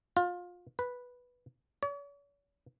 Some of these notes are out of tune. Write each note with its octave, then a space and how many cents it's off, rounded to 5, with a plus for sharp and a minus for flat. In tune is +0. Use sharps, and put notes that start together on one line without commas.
F4 +25
B4 -5
C#5 +45